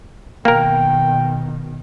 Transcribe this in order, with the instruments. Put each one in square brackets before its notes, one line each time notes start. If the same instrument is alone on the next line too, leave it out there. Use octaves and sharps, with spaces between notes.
[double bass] B2 D#3 [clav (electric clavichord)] A#3 A#4 [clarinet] G5